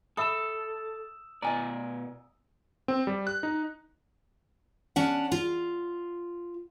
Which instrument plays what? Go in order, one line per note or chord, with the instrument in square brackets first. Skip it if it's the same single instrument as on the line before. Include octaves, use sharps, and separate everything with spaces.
[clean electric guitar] A4 [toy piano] E5 B5 C#6 [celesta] D#6 E6 E7
[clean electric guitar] B2 D5 [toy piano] D#5 G#5 A#5
[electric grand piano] C4
G3
F#6
D#4
[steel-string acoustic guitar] C#4 D4 F#5
F4